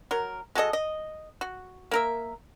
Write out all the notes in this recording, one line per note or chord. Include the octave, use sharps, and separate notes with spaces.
F#3 A#4
G#3 F#4 A4 D#5
D#5
F#4
A#3 A#4 E5